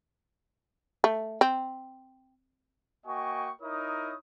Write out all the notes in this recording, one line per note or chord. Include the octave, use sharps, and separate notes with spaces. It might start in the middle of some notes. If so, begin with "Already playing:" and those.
A3
C4
A#3 F#4 D#5 G5 G#5 C#6
D#4 E4 A#4 C#5 D#6